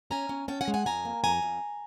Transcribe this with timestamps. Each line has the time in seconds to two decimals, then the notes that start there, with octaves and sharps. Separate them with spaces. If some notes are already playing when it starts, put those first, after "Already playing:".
0.11 C#4 G#5 A#5
0.29 C#4
0.48 C#4 G5 A5
0.61 F#5 G#5
0.68 G#3
0.74 F#5 G#5
0.86 F2 G#5 A#5
1.05 A#3
1.24 F2 G#5 A#5
1.42 F2